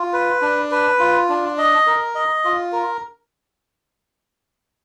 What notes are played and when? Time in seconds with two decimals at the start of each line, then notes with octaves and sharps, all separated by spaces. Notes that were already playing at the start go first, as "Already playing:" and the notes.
Already playing: F4
0.13 B4
0.42 D4
0.71 B4
0.99 F4
1.29 D4
1.58 D#5
1.87 A#4
2.15 D#5
2.44 F4
2.72 A#4